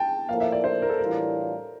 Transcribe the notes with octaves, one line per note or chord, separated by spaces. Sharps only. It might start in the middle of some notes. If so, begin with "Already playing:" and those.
Already playing: G5 A5
A2 F3 A#3 F5
E5
D5
C5
A#4
A4
A2 E3 G3 D4 F4 A#4